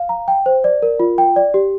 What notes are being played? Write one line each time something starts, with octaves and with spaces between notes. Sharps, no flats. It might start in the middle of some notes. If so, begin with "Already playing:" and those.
Already playing: F5
A#5
G5
C5
D5
A#4
F4
G5
D5
G4